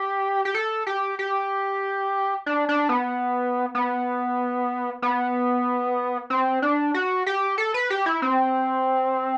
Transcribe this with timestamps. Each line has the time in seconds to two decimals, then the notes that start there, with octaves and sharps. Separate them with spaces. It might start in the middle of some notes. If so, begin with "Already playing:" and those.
Already playing: G4
0.45 G4
0.55 A4
0.87 G4
1.19 G4
2.46 D4
2.69 D4
2.89 B3
3.75 B3
5.02 B3
6.30 C4
6.62 D4
6.94 F#4
7.26 G4
7.58 A4
7.74 B4
7.90 G4
8.06 E4
8.22 C4